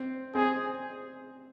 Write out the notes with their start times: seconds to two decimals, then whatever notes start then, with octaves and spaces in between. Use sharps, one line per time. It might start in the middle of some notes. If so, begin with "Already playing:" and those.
Already playing: C4
0.35 C4 G#4